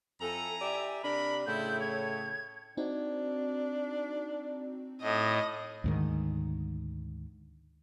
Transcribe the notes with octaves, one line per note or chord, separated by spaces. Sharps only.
F2 E4 A4 G#5 A#5
G4 D5 E5
C3 D4 A#4 B5
A2 C#3 A3 E4 F4 E5 G6
C#5 G#6
C4 D4 D#4 F#4
A2 D#5
D2 G#2 D#3